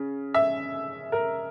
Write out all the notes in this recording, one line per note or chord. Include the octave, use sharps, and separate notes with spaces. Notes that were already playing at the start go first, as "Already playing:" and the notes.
Already playing: C#3
E5
A#4